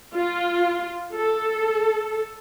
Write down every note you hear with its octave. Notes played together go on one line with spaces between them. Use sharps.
F4
A4